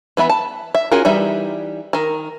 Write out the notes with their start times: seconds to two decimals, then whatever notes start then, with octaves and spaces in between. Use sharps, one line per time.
0.17 E3 B3 E5 B5
0.29 A5
0.75 E5
0.92 C#4 F4 F#4 G#4 A#4
1.05 E3 G3 D#4 E5
1.93 D#3 A#4